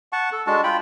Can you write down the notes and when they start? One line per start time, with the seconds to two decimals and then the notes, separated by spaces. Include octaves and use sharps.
0.13 F#5 A5 C#6
0.32 A4
0.47 G#3 D4 F#4 A5
0.63 F4 G5 B5